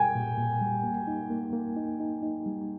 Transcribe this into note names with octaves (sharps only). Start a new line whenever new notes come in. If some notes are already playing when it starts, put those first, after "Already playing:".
Already playing: B2 G3 G5 G#5
A#2
A#2
G3
A#3
D#4
A#3
A#3
D#4
D#4
D#4
G3